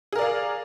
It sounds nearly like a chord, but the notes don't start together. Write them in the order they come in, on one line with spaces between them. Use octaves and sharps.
G#4 A#4 D5 F5